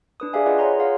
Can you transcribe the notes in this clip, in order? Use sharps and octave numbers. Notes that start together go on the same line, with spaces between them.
D4 B4 D#6
G4 G#4 D5 E5 F5 G#5
F4 G#4 B4 D#5 F#5
C#5 F#5 A#5 C6
F4 G#4 C#5 F5 F#5